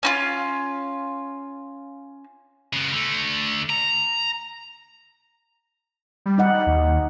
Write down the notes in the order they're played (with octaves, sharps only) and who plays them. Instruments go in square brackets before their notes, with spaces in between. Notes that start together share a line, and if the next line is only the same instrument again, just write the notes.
[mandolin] C#4 E4 F4
[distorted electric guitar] C#3 B3
D3 A3
A#5
[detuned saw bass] G3
[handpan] D#4 D#5 F#5
[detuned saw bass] G3
D#2